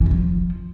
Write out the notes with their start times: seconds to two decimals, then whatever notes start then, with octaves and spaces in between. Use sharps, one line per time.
0.01 E3
0.06 E2
0.11 F3